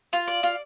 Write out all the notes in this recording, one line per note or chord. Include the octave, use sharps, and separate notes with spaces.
F4
D5
F4